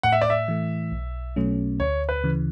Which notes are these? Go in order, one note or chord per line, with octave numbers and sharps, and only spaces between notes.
A2 F#5
E5
D5
E5
E3 A3
B1
B2 F#3 A3 C#4
D2 C#5
B4
C#3 E3